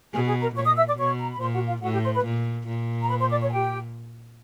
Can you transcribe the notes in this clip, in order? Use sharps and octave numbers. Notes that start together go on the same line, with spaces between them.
B2 G#4 G#5
G#4 G#5
A#4 A#5
A#2 C#5 C#6
D#5 D#6
E5 E6
D5 D6
B2 C#5 C#6
A#5
B5
A#2 C5 C6
F#4 F#5
F4 F5
A2 F#4 F#5
G4 G5
C5 C6
B4 B5
A#2
A#2
A#5
B4 B5
C5 C6
D5 D6
C#5 C#6
G#5
G4 G5